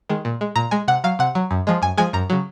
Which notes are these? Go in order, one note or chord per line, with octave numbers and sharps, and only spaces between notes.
D#3 G#3
A#2
G#3
A#2 A#5
G#3 G#5
C3 F#5
F#3 F5
C3 F#5
F#3
F#2
F3 G#3
F#2 G#5
F3 G#3 G#5
F#2 A#5
C#3 F#3